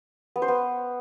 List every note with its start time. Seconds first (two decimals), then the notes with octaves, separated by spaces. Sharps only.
0.36 B3
0.42 C5
0.48 B3